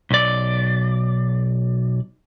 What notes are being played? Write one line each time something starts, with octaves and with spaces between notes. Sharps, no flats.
B1 D5